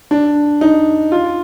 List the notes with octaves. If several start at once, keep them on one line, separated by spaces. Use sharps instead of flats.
D4
D#4
F4